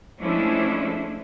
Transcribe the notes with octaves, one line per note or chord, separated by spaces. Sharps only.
F3 G#3 A3 C#4 D4 E4